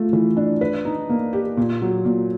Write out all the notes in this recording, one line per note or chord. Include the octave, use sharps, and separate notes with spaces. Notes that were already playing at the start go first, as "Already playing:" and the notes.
Already playing: A3 F4
E3
D4
B4
D#4
A#3
G4
A#2
F#3
A#2